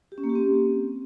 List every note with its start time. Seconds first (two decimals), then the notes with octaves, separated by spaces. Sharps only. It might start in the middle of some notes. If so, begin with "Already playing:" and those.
0.12 G4
0.18 C#4
0.24 A#3
0.29 G4
0.35 C4